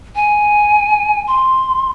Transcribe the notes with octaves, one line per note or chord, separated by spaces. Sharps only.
G#5
C6